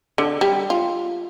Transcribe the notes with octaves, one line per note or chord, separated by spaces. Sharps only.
D3
G3
F4